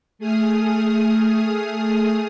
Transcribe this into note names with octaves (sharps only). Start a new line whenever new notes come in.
A3 G#4 D#6 F6